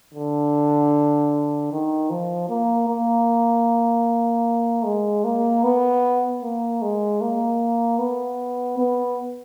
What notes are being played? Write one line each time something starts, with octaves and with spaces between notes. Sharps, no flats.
D3
D#3
F3
A#3
A#3
G#3
A#3
B3
A#3
G#3
A#3
B3
B3